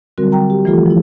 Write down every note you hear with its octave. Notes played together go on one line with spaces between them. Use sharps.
D3 F#3 G3 C4 F#4 A#4
G5 A#5
G4
E3 F3 A3 F4 G4 A4
F3 E4